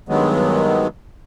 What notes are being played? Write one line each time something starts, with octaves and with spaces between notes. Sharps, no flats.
G2 D#3 F#3 G#3 B3